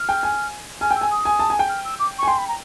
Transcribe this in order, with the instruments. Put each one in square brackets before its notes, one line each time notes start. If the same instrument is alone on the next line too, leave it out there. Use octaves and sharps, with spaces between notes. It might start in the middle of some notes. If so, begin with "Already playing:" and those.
Already playing: [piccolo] F6
[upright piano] G5
G#5
[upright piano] G#5 [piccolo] F6
[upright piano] G5 [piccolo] E6
[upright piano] G#5
[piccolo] D#6
[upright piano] G#5
A5
G#5
G5
[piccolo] F6
E6
D6
C#6
[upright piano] G#5
[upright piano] G5 [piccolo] C6
[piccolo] B5
A#5